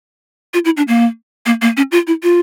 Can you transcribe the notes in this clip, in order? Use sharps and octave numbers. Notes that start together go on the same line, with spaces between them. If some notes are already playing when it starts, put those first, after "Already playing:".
F4
E4
D4
A#3
A#3
A#3
C#4
F4
E4
F4